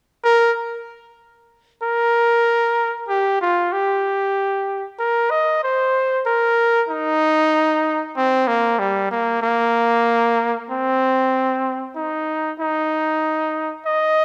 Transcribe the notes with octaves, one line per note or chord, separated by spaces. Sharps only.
A#4
A#4
G4
F4
G4
A#4
D#5
C5
A#4
D#4
C4
A#3
G3
A#3
A#3
C4
D#4
D#4
D#5